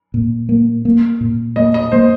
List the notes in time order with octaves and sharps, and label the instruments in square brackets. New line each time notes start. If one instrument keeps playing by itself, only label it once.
[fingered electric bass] A#2
A#3
A#3
A#2
[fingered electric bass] A#3 [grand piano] D#5
[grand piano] D#5
[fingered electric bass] A#3 [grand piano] C5